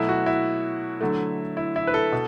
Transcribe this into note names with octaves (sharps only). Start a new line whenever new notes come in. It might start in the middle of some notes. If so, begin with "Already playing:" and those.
Already playing: B2 F#3 A3 E4
F#4
E4
D3 F#3 A3
E4
E4
B4
A4
B2